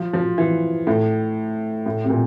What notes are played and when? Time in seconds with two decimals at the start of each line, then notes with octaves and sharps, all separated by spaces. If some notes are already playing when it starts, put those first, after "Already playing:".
Already playing: F3
0.13 F3
0.38 E3
0.87 A2
1.86 A2
2.04 C3
2.10 A#2